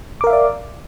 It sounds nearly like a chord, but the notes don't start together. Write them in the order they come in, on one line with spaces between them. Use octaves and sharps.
D6 A#4 F5 E5 D5